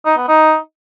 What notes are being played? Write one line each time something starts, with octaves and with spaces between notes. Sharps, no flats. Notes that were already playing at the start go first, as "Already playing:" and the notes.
D#4
B3
D#4